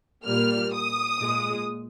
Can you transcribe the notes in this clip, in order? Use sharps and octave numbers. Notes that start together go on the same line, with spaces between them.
A#2 G3 A#3 F6
D#6
A#2 G#3